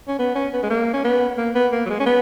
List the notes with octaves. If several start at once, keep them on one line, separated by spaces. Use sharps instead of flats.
C#4
B3
C#4
B3
G#3
A#3
C#4
B3
A#3
B3
A#3
F#3
G#3
C#4
B3